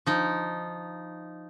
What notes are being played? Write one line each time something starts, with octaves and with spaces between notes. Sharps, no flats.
F3 D#4 F4